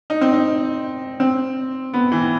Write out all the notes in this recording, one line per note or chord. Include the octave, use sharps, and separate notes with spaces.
D#4
C4
D#4
C4
B3
E3